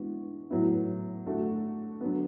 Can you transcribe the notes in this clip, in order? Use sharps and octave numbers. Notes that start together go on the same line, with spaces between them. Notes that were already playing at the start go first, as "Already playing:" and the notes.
Already playing: E3 G#3 B3 D4 F#4
A2 F#3 B3 E4
D3 A3 D4 F#4
D3 F#3 B3